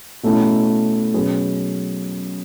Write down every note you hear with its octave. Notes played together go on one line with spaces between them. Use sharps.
B2 A3 C#4 E4
B2 F#3 C#4 G#4 B4